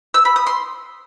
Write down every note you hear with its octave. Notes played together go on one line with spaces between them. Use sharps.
E6
B5
D#6
C6